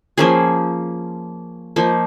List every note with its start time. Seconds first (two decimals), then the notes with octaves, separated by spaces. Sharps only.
0.18 F3 A#3 C#4 G#4
1.76 F3 A#3 D#4